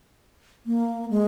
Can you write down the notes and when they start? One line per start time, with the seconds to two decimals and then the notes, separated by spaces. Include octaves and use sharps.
0.66 A#3
1.10 G#3